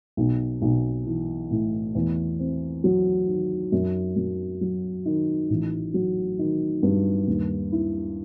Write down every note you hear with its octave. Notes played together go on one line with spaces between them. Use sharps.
B1
B1
E3
A2
E2
C4
F#3
D#3
F#2
F#2
F#3
D#3
A1
F#3
D#3
G2
D#2
E4